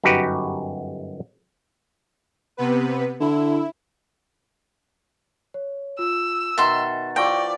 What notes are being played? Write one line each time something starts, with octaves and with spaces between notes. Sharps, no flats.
G1 F#2 D#4 F#4 G4 B4
C3 B3 B4
D3 E4
C#5
F4 E6
B2 D#3 E5 C6 A6
F3 E4 G4 D5 G5 C#6 A#6 D7